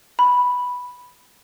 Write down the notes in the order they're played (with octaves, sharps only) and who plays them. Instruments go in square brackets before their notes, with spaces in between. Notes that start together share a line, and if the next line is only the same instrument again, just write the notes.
[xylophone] B5